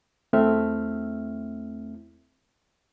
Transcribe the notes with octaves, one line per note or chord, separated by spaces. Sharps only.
E2 A3 C4 E4 E5 F6